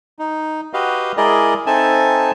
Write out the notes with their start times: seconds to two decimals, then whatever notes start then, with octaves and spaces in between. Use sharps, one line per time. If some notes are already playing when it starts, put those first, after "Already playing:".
0.19 D#4
0.73 F#4 G4 B4 D#5 F5
1.17 G#3 E4 G#4 A#4 D5 D#5
1.66 C4 D#4 A4 E5 G#5 A5